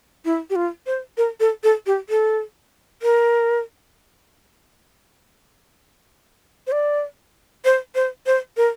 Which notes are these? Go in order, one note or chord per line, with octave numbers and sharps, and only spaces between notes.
E4
G4
F4
C5
A#4
A4
A4
G4
A4
A#4
C5
D5
C5
C5
C5
A#4